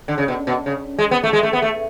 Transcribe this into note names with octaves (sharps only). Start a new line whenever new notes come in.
D3
C#3
B2
B2
C#3
G#3
B3
A3
G#3
A3
B3
A3